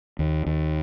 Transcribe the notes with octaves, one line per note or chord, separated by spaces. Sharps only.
D#2
D#2